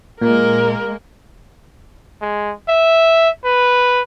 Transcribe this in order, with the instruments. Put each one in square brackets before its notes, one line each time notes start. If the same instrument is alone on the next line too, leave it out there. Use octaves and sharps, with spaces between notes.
[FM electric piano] A#2 [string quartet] G#3 A#3 [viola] A#4
[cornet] G#3
E5
B4